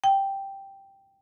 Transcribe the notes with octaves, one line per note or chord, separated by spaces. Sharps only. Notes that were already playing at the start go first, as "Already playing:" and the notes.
G5